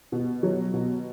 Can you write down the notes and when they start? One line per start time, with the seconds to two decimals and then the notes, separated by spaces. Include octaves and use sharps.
0.12 B2
0.43 F#3
0.74 B2